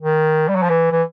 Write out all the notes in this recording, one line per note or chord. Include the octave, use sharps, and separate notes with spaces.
D#3
G3
F#3
F3
E3
E3